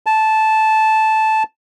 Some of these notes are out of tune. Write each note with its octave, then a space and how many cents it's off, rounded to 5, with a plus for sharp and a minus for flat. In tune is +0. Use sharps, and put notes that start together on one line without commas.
A5 -10